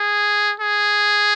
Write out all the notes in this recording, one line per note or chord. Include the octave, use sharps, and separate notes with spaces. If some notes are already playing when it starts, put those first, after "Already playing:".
Already playing: G#4
G#4